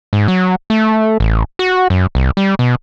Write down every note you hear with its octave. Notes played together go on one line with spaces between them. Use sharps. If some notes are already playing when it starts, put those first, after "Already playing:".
G#2
F#3
A3
A1
F#4
F#2
C2
G3
B2